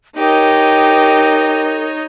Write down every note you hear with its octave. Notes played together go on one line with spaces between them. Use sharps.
D#4 G4 A#4 C#5 D#5